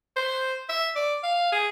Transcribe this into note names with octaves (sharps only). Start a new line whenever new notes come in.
C5
E5
D5
F5
G#4